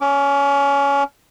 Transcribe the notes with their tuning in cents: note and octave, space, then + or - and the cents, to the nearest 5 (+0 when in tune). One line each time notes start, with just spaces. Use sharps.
C#4 +20 D6 -25